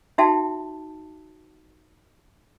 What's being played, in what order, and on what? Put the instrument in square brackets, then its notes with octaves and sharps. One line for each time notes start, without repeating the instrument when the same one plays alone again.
[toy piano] D#4 F#4 E5 G5 A5